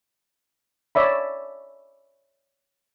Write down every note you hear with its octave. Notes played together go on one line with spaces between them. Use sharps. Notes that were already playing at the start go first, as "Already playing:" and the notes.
C#5 D5 E5 B5